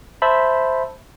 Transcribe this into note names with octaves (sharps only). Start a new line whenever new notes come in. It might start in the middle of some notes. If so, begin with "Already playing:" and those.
C5 E5 A5 B5